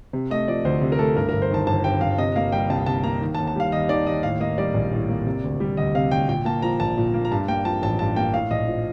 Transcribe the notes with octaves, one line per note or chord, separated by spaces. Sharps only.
C3
A3 D#5
F3 D5
D2 C5
C3
A#4
A3 A4
G2 A#4
A#4
G1
C5
D#3 A5
G1 A5
G2 G5
G1 F5
C3 D#5
A#3 F5
G3 G5
C2 A5
C3 A5
A#3 A#5
D#3
A5
D#2
A5
G3 F5
D#2 D#5
D#3 D5
D#2 D#5
A2 F5
A#3 D#5
G3 D5
A#1
A2
A#3
C3
D2
G3
D2 D#5
C3 F5
D2 G5
A#2 G5
A#3 A5
F3 A#5
A#1 A5
A#2
A#3
A#5
G2 A5
A#3 G5
F3 A5
A1 A5
G2 A5
A#3 G5
A2 F5
A#1 D#5
F3